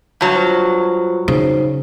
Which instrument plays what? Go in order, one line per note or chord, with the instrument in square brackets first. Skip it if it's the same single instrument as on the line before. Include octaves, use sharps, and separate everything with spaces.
[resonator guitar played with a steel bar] G2 F#3
[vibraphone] F4 C5
[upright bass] C#3 [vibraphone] D#4 C5